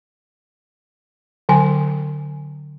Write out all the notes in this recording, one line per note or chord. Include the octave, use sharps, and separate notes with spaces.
D3 F#3 G5 G#5